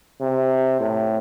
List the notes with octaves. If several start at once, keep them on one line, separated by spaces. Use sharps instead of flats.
C3
A2